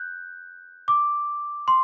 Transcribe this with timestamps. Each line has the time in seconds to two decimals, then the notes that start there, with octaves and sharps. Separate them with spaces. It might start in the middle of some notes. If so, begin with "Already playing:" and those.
Already playing: F#6 G6
0.88 D6
1.68 C6